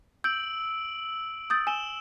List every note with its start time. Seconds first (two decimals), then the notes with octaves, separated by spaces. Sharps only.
0.24 E6 G6 D7 F#7
1.50 D#6 G6 A6
1.67 G#5 E6 E7 G7